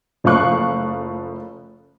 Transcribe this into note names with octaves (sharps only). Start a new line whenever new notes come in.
F#1 F3 A3 F5 C#6 F#6